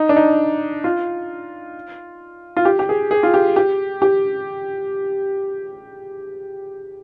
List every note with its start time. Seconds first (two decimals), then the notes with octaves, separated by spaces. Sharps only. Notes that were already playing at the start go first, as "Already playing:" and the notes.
Already playing: D#4
0.09 D4
0.16 D#4
0.84 F4
2.57 F4
2.65 G4
2.79 G4
2.89 G#4
3.11 G#4
3.23 F4
3.34 G4
3.56 G4
4.02 G4